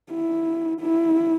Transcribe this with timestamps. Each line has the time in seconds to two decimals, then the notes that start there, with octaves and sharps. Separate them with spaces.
0.11 E4
0.81 E4